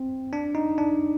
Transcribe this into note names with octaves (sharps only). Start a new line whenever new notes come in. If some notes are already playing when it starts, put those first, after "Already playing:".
Already playing: C4
D4
D#4
D4